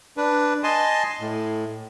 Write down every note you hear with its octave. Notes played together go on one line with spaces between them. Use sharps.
D4 B4
D#5 G#5 A5 C6
A2